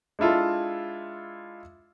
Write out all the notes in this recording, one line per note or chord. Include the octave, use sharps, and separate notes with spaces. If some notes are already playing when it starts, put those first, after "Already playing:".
G#3 D4 E4 F4 A4